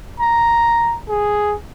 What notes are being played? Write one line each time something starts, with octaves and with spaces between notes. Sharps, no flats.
A#5
G#4